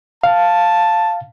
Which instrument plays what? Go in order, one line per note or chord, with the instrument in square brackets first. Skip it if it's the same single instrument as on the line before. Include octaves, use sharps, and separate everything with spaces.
[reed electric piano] F5 [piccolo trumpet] A5